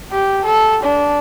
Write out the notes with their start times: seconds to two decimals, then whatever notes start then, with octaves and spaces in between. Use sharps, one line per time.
0.12 G4
0.45 A4
0.83 D4